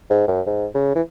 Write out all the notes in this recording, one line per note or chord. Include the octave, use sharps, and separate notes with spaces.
G#2
F#2
G#2
C#3
E3